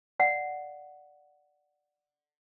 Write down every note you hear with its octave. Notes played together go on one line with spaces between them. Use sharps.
D5 F5 F#5